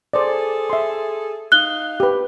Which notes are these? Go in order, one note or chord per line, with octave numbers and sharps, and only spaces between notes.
G#4 A4 C5 D5
E5 C6
D#4 F5 F#6 G7
G4 B4